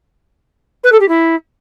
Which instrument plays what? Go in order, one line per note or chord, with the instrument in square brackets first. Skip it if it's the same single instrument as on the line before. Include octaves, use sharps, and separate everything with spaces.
[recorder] B4
A4
G4
E4